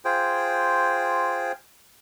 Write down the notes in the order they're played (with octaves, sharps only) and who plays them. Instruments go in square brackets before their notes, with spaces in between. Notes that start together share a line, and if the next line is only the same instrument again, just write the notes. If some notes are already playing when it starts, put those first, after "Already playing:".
[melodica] F4 G#4 C5 G5